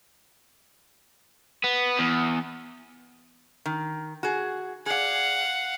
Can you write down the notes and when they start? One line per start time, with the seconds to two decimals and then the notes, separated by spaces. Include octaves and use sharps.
1.64 B3
1.99 E2
3.66 D#3
4.23 F#4 G#4
4.86 G#4 D5 F5 F#5